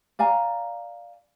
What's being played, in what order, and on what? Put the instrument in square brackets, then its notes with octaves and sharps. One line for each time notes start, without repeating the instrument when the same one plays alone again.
[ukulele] D5 F5 G#5 A#5